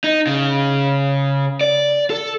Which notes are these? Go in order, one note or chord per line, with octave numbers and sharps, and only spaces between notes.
D#4
C#3
D5
A4